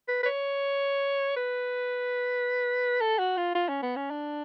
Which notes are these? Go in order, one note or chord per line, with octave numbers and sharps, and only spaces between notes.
B4
B4
C#5
B4
A4
F#4
F4
F4
C#4
B3
C#4
D4